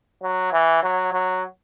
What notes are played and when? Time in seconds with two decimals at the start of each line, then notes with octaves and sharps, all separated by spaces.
0.23 F#3
0.53 E3
0.83 F#3
1.12 F#3